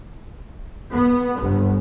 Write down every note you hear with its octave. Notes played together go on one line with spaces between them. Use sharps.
B3
G1